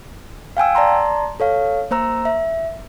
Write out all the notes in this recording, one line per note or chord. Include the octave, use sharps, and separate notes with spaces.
F5 G5 G#5 E6
D5 A5 A#5 C6
A4 C#5 F5
A#3 C5 A#5 E6
E5